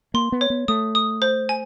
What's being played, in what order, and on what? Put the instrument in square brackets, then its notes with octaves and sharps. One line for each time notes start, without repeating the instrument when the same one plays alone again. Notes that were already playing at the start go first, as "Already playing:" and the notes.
[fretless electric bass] A#3 [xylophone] C6
[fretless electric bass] B3
[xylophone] C#5
[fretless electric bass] B3
[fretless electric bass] A3 [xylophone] D#6
[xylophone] D#6
C5
G#5